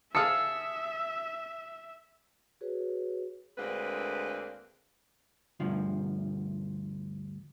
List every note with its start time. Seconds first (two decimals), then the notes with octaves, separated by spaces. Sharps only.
0.15 G#4 E5 F5 A5 D#6 E6 C#7
2.61 F#4 G#4 B4 C#5
3.57 D2 G#3 A#3 C4 D4 B4
5.60 D2 G2 F3